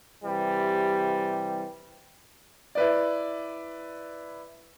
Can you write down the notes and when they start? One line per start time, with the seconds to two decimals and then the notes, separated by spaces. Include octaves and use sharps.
0.23 C3 E3 G3
2.75 E4 B4 D5